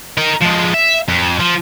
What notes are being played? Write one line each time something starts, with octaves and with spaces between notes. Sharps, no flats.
D#4 A#4
F3 G#3
E5
F2
F3